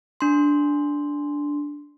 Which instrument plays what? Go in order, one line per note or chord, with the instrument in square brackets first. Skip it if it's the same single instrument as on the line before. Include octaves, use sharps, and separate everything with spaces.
[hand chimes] D4 C6